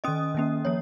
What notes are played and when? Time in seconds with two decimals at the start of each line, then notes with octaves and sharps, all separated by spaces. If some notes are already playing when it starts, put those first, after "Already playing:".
0.04 D#3 C#4 D#5 D#6
0.35 D#3 A#3 C#4
0.65 F3 A#3 C#5